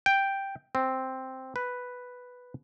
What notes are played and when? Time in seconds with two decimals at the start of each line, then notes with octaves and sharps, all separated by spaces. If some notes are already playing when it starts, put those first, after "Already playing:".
0.06 G5
0.75 C4
1.56 B4